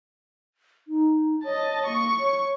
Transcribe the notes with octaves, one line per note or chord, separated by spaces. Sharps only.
D#4
C#5 D#5 A5
A#3 C#6
C#5